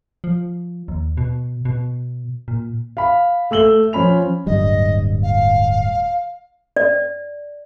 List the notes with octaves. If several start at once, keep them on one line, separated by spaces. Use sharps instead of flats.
F3
D#2
B2
B2
A#2
F5 B5
A3 E6 F#7 G7
F3 C#4 B5 F7
D1 G2 G3 D#5
F5
D5